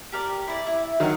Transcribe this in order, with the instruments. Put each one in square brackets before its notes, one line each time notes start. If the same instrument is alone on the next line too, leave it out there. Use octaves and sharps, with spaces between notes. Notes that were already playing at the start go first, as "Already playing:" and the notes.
[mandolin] G4 A#4 D5
E4 D5 D6
E4
[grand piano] D#3 F#3 [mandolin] F5 F#5